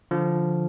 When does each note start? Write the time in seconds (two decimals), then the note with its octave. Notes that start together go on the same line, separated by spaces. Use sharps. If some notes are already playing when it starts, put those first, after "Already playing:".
0.11 D3 F3